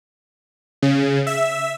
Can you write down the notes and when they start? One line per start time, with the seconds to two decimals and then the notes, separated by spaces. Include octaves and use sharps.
0.82 C#3
1.27 E5